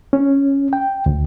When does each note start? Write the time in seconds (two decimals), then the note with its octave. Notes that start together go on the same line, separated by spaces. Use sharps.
0.13 C#4
0.73 G5
1.06 D2